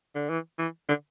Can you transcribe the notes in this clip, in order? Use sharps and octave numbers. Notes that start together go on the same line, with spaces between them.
D3
E3
E3
D3